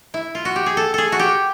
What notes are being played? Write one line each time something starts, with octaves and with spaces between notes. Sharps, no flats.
E4
F4
F#4
G4
G#4
A4
G#4 A4
F#4
G4